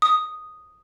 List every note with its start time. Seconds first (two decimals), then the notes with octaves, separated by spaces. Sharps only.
0.02 D#6